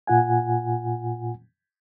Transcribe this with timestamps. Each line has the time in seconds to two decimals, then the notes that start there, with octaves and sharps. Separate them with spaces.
0.07 A#2 F4 F#5 G#5